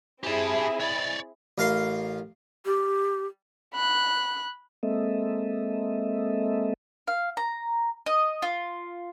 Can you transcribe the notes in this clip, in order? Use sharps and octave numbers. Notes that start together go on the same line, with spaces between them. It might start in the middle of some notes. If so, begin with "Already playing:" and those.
C4 E4 G4 G#4 A5
C#5 D5
A1 A#4 F5 C6
G4
B5 F#6
G#3 A#3 C4 A4 D#5 E5
F5
A#5
D#5
F4